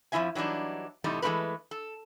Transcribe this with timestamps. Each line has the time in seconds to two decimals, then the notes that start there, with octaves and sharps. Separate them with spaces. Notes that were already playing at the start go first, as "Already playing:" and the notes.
0.12 F2 F3 G3 E4 E5 G#5
0.35 E3 F#3 G3 D4 D#4
1.04 E2 A2 C3 G3 A3 D#4
1.22 E3 G#3 A3 C4 G4 B4
1.71 A4